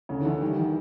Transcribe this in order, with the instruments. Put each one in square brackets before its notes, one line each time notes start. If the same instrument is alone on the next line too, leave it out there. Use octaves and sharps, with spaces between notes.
[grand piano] D2 [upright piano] C#3
[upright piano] D#3
[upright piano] D3 [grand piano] E3
[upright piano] D#3 [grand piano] G3
[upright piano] D#3 [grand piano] E3